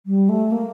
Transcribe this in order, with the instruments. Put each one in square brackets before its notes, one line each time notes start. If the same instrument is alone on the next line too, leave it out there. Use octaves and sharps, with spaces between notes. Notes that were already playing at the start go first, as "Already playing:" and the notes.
[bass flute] G3
A3
A#3